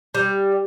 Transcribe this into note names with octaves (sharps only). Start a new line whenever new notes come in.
G3